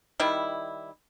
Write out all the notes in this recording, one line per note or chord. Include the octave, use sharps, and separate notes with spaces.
D#3 G3 E4